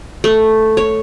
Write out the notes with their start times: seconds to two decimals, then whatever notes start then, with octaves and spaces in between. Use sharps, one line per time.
0.24 A3
0.77 C#5